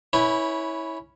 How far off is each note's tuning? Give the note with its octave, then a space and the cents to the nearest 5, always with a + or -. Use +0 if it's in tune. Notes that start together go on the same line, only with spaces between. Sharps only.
C#4 +0 E4 -20 B4 +0